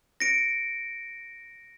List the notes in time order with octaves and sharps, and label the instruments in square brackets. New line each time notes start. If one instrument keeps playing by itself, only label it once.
[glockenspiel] A#6 C#7 D7